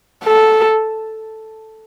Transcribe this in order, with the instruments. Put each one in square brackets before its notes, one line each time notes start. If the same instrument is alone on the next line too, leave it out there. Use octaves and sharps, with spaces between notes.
[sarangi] A4